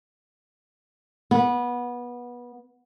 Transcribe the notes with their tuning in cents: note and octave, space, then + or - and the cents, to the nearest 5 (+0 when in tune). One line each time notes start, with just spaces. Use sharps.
B3 -20